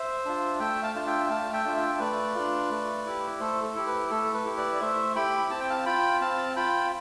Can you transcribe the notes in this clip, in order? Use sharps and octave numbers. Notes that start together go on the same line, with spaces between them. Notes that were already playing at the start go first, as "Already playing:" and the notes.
Already playing: C5 E5
D4 F4
A3 E5 G5
F5 A5
D4 F4 A5
E5 G5
G5
A3 F5 A5
E5 G5
D4 F4
E5 G5
A3 B4 D5
D4 F4
A3
E4 G4
A3 A4 C5
A4
E4 G4
B4
A3 A4
B4
E4 G4
B4 D5
D5
A3 C5 E5
E4 G4 G5 B5
C4 A5
G5
F5 A5
F4 G5 B5
C4 F5 A5
F4 G5 B5